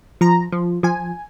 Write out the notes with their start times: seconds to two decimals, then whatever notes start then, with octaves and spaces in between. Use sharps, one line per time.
0.21 F3 A#5
0.52 F3
0.83 F3 G#5